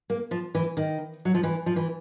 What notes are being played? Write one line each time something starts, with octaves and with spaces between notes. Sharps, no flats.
A#3
F3
E3
D#3
F#3
F3
E3
F3
E3